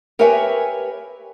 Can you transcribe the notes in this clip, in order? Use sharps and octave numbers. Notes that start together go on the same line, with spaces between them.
G4 A#4 B4 C#5 E5 G#5